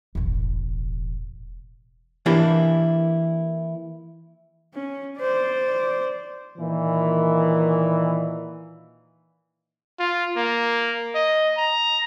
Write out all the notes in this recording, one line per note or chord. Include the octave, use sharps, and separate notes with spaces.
E1 A1
E3 A#3 D4 E4 G4
C#4
C5 D5
A#2 D#3 E3
F4
A#3
D#5
A#5